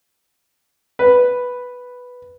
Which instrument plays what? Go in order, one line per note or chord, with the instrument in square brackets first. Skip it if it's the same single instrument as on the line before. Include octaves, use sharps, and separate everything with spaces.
[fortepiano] B4